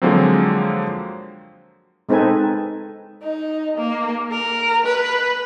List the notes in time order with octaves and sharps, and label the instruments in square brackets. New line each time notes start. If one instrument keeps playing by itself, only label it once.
[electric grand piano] D3 F3 F#3 G#3 A#3 C4
[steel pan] G#3 C4 D#4 A4 B4 G#5
[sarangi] D#4
A#3
A#4
B4